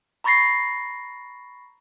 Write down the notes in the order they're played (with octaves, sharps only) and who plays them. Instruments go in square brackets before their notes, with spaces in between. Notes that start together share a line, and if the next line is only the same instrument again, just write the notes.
[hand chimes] A#5 B5 C#6 A6 A#6 C7